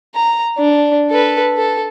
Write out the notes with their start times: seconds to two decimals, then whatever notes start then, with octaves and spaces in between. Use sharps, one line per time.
0.15 A#5
0.58 D4
1.10 A4 B4
1.58 A4